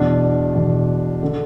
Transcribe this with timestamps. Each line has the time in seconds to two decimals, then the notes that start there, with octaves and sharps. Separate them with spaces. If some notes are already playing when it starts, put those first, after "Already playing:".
Already playing: E2 B2 D4
0.55 E2 B2
1.23 D3